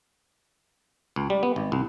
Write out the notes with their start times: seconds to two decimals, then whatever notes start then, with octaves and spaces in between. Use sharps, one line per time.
1.16 C#2
1.30 G3
1.43 B3
1.56 G#1
1.72 C2